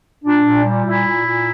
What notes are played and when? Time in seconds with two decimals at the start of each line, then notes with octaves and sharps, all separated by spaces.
0.24 A#2 D4
0.44 A#2
0.64 G3
0.85 A#2 E4
1.05 A#2
1.24 A#2